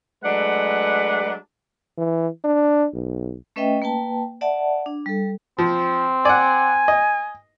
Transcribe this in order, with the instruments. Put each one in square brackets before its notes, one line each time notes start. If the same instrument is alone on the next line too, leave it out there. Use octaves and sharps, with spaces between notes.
[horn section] F#3 G#3 A3 D4 B4 F#5
[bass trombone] E3
D4
B1
[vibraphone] A3 C#4 B4 D#5 E5 G5
A#3 B4 G5 A5
D5 E5 F#5 A5
D4
G3 A4
[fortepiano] F3 [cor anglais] C4
[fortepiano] D5 F#5 [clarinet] G#5
[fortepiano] D#5